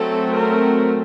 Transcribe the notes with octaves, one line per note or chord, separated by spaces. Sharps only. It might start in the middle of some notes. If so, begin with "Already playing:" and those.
Already playing: F#3 A3 C4 A4
A#4